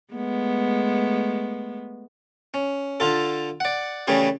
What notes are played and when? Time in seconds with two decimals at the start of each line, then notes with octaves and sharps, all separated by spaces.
0.13 G#3 A3 B3
2.54 C#4
3.00 D3 F4 A4
3.60 D5 F#5
4.07 C#3 E3 G3 A3 C#4 G#4